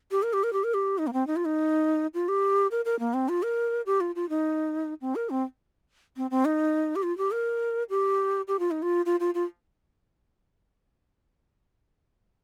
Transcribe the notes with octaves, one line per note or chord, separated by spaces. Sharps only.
G4
A#4
G4
A#4
G4
A#4
G4
D#4
A#3
C4
D#4
F4
D#4
F4
G4
A#4
A#4
A#3
C4
F4
A#4
G4
F4
F4
D#4
C4
A#4
C4
C4
C4
D#4
G4
F4
G4
A#4
G4
G4
F4
D#4
F4
F4
F4
F4